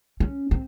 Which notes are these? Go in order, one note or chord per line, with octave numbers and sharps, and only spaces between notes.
C#4
C4